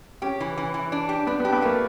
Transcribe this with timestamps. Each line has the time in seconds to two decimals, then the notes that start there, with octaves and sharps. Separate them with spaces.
0.22 C#4 G4
0.40 E3
0.57 E3
0.74 E3
0.92 D4
1.09 G4
1.27 B3 D4
1.40 B3
1.45 G4
1.53 B3
1.62 A3 A#3